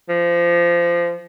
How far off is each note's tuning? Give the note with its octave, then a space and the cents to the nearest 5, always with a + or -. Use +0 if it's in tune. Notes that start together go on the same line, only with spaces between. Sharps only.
F3 -20